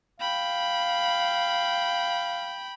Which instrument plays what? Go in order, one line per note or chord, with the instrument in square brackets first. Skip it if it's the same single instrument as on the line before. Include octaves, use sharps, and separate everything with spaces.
[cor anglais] F5 [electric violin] G5 B5